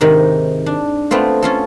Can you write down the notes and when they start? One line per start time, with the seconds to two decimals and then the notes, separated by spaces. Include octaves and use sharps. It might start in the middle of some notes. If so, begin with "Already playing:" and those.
0.01 G#2 C3 D#3
0.66 D4
1.11 A3 B3 C4 F4
1.42 C#4 F4 A4